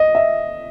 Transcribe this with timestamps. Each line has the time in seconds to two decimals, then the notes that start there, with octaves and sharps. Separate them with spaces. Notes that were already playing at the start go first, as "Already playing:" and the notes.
Already playing: D#5
0.15 E5